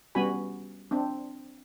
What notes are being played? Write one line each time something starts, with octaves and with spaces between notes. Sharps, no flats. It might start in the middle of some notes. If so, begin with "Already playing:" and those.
G3 B3 C#4 F#4 G#5 B5
C4 D4